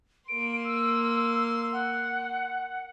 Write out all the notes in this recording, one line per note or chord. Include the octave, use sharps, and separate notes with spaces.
A#3 C6 D7
E6
F#5